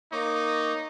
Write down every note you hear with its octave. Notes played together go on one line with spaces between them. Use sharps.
A#3 D#4 C#5 D6